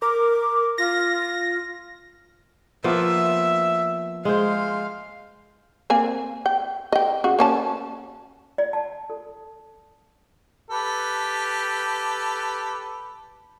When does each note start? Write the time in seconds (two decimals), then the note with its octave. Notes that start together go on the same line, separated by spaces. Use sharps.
0.02 A#4 D6
0.78 F4 A#6
2.84 F3 A#3 B3 E5
4.25 G#3 C5 F5
5.90 A#3 C4 G#5
6.46 G5
6.92 D#5 G5
7.24 C#3 F#4
7.39 A#3 C#4 A5
8.58 D5
8.73 A5
9.10 A4
10.70 G4 A4 B4